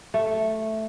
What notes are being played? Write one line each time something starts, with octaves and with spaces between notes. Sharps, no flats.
A3